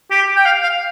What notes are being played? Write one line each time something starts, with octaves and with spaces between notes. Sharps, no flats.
G4
G5
F5
F5